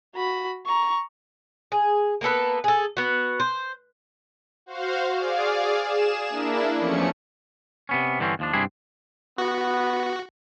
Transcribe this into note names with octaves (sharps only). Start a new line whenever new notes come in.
F#4 B5
A#5 C#6
G#4
A#3 B3 A4 B4
G#4 A4
B3 F#4
C5
F#4 C5 F5
G#4 D5 F5
G#4 E7
A#3 D4 E4
E2 F3 A3 C#4 C#7
C3 B3 C#4
G2 D3 E3 C4 C#4
D#2 F3 D4
C2 G2 C4 D4 E4 G#4
B3 F#4